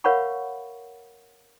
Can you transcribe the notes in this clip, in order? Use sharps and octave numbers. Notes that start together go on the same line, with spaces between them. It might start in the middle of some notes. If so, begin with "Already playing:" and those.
A#4 C#5 F5 F#5 B5 C#6